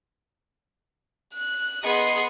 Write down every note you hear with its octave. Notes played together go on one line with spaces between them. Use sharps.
F#6
B3 G#4 D#5 C6